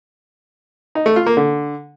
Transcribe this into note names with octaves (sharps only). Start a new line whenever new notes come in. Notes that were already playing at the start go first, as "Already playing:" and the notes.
D#4
A3
F4
A#3
D3